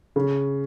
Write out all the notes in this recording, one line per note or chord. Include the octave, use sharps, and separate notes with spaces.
C#3